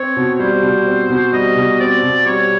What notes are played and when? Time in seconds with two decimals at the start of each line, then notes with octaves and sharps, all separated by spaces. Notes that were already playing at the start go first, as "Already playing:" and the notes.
Already playing: C4 C#5
0.16 B2
0.34 C#5
0.40 G3 C5
0.63 B2
0.86 C4
1.10 B2
1.33 G3 D#5
1.56 B2
1.80 C4 D5
2.03 B2
2.26 G3 C#5